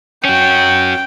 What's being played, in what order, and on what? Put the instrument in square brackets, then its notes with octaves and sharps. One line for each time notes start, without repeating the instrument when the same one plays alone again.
[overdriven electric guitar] C#4 F#4 [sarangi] G5